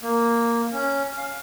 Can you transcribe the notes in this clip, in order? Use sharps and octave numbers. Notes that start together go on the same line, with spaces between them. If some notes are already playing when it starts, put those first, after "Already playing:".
A#3
C#4
F5